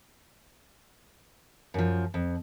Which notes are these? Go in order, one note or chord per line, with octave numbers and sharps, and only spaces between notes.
F#2 F3
F2